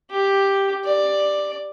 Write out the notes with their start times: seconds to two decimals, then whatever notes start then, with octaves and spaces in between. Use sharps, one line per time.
0.11 G4
0.84 D5